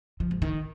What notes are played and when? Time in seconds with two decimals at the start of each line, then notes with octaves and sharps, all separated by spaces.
0.20 F3
0.31 G#2
0.42 D#3